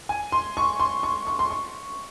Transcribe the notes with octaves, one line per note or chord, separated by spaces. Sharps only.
G#5
C6
C#6
C6
C#6
C#6
C6
C#6